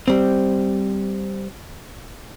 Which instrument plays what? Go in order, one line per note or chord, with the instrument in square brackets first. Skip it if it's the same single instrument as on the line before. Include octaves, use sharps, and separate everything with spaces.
[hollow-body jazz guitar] G3 C4